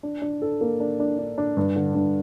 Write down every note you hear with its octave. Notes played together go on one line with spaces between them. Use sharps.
D4
D4
A4
A#3
D4
D4
D4
D4
G2
D3
G2